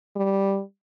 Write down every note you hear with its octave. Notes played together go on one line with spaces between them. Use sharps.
G3